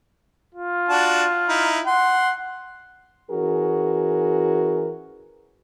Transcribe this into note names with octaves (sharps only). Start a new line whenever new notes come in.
F4
D4 F#4 A5
D#4 E4
F#5 C6
E3 C#4 F#4 G#4 A#4